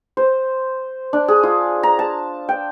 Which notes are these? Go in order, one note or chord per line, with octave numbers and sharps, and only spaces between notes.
C5
D4
G#4
F4
A#5
A5
G5